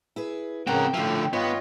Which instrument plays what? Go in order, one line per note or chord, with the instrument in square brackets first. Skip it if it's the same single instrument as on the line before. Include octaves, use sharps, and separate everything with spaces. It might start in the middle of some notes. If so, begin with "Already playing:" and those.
[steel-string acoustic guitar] E4 G#4 B4
[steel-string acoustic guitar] A2 F3 [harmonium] C#3 F#5 [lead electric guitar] C4 A#4 [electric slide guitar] G5
[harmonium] A2 E5 [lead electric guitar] D3 F3 [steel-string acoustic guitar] C#4 F4
[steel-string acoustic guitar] G2 D#3 [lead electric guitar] B3 [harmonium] F4 C#5 D#5